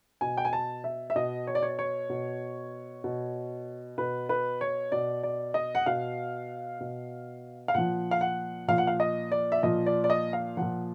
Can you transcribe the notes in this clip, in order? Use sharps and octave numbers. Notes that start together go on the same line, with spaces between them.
B2 G#5
G5
G#5
A5
E5
E5
B2 D#5
C#5
D5
C#5
C#5
B2
B2
B2 B4
B4
C#5
B2 D5
D5
D#5
F#5
B2 F5
B2
F5
A#2 F3 F#5
F5
F#5
A#2 F3 F5
F#5
F5
D#5
D5
E5
A#2 F3 D#5
D5
D5
D#5
F5
A#2 F3 F#5